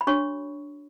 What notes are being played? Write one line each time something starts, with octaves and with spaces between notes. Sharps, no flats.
B5
D4 F#4 C#5 C#6